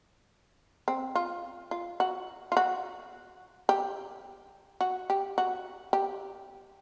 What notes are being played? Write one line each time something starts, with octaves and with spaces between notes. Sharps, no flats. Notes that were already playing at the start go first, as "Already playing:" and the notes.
C4
F4
F4
F#4
F4
F#4
G4
F#4
G4
F#4
G4